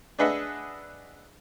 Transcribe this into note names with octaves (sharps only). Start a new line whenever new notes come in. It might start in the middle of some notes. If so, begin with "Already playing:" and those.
D4 G#4 B4 D#5 E5 F#5